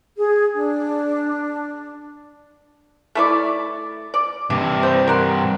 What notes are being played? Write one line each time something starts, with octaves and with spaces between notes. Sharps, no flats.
G#4
D4
A3 E4 D5
D5
G2 C3 D4
C5 G5
A#4 F#5 C6